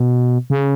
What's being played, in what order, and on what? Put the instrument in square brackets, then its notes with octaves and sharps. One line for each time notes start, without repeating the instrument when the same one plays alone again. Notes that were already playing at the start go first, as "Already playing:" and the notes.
Already playing: [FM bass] B2
C#3